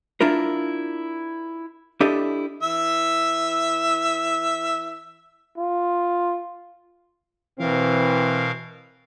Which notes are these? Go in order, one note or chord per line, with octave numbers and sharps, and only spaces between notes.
D4 E4 F4 A#4
D4 E4 G4 A4 D#5
E3 E5 E6
F4
B2 E3 C4 A#4 F5